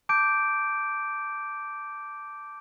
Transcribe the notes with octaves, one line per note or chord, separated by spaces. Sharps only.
A5 D6 G6 D7